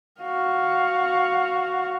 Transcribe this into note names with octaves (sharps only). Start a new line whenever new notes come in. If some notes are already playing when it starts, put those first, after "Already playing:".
F#4 F5